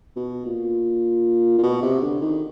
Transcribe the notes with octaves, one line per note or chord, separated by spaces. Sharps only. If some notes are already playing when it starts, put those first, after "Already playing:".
B2
A#2
A#2
B2
C3
D3
D#3